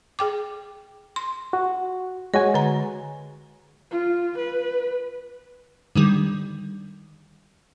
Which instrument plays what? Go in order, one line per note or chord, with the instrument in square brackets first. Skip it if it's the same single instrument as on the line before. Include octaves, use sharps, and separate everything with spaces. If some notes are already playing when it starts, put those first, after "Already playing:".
[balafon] G#4 G5 D6
C6
[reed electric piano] F#4
[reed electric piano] G#3 F#4 G#5 [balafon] C#5
[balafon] D3 A#5
[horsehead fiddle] F4
B4
[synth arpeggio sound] D3 D#3 G3